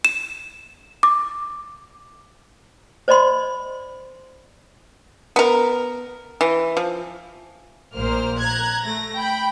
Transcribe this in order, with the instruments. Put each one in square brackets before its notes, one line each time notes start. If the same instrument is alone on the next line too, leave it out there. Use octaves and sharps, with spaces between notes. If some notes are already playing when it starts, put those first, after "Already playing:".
[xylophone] E7
D6
[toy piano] C5 D5 D#5 B5 C6
[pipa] B3 A#4
E3
F3
[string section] A#1 A#2 A#3 C5 F6
A#5 F#6 G#6
A3 A#6
G5 B5